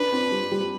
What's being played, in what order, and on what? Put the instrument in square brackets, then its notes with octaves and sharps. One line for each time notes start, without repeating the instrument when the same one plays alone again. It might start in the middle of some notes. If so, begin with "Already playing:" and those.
Already playing: [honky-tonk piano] D4 [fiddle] B4
[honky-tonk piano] C4
G3
G3